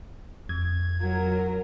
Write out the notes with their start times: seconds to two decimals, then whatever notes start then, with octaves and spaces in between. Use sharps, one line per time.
0.49 F2 G#6
1.02 F#3 A#4